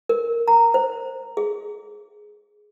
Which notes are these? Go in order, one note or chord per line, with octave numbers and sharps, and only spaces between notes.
A#4
A#5
C5
G#4